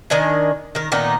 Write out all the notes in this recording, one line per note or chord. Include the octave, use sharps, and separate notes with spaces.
D#3 D4 D#5 G#5
D#3 A#4
A#2 D#3 B3 D#4